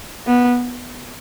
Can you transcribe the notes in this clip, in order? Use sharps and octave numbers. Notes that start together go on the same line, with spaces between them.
B3